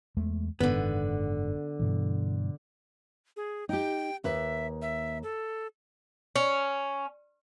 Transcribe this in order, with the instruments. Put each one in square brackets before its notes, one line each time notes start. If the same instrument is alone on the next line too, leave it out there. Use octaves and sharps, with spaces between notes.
[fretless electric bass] E2 G#3 A3
[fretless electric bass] F#1 G#2 D#3 [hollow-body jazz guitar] D3 B3
[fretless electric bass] G2 B2 E3
[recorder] G#4
[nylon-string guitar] D#4 G4 [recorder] G5
[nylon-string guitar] D#2 B4 [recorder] E5
[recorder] E5
A4
[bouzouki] C#4